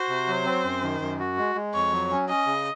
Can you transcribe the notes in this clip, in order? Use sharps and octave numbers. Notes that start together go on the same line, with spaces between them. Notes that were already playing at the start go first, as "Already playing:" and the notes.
Already playing: F#4 C5
C3
F#3
C4
F#2
D#3
F#2
F#4
G#3
G#3
F2 C#5
F#3
C#4
C#4 D#5
C#3